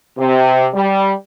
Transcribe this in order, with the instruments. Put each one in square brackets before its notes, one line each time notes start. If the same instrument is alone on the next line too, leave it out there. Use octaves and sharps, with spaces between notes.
[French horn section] C3
G3